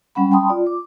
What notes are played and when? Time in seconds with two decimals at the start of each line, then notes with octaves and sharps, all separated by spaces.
0.15 G3 C#4 F#5 B5
0.32 G5 A5 B5 C6 D#6
0.49 F4 D5
0.67 D6